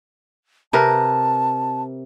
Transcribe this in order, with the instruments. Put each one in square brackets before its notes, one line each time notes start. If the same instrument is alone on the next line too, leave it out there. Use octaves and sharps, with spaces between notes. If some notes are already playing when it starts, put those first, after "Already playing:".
[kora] C3 A#4 B4 [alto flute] A5